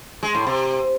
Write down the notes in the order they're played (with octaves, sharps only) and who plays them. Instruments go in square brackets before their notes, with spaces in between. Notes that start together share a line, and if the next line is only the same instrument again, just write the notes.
[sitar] G#3
A2
C3